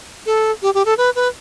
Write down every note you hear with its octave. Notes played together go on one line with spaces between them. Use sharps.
A4
G4
G4
A4
B4
B4